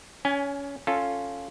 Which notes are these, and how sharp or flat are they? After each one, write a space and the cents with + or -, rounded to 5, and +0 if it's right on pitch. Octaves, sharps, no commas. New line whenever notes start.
C#4 +20 G#5 +0
C#4 +0 F4 +0 A4 +0